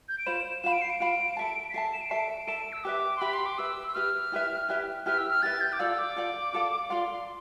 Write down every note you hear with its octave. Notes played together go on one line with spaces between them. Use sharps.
G6
D7
F4 C5 F5 B5 E7
F4 C5 F5 B5 E7
D7
C7
D7
F4 C5 F5 B5
A4 E5 A5
B6
A4 E5 A5 C7
E7
D7
A4 E5 A5 C7
D7
A4 E5 A5 E7
D7
E6
G4 B4 E5 D6
C6
G4 B4 E5 B5
C6
D6
G4 B4 E5 E6
E6
G4 B4 E5 F6
E4 G4 B4 E5
E4 G4 B4 E5
E4 G4 B4 E5 F6
E6
F6
E4 G4 B4 E5 A6
G6
D6
F4 A4 D5 F5 E6
D6
F4 A4 D5 F5
F4 A4 D5 F5
F4 A4 D5 F5 C6
C6